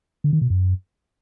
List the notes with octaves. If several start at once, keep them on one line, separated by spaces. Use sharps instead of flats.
D3
D#3
B2
F#2